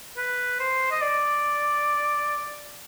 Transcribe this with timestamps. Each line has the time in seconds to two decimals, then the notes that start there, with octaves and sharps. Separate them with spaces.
0.17 B4
0.59 C5
0.91 D#5
1.02 D5